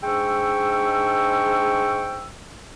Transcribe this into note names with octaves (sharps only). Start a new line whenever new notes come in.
G#2 G#3 D4 G5 C#6 E6